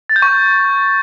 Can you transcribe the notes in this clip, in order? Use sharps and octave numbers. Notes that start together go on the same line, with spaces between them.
A6
G6
C#6